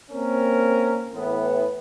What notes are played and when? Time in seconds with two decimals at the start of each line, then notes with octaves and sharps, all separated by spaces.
0.11 A#3 C4 C#4 A#4
1.14 A2 E3 B3